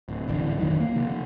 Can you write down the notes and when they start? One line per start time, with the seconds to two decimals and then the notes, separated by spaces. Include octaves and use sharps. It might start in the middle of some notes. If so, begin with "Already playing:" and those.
0.08 D1
0.28 D1 G#1 D3 E3
0.58 B1 F2 D#3
0.80 A#3
0.96 C3 F3